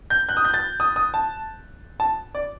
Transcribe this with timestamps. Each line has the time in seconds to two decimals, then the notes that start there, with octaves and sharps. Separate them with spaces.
0.10 G6
0.29 F#6
0.37 D#6
0.45 G6
0.54 A6
0.80 D#6
0.96 D#6
1.14 A5
2.00 A5
2.35 D5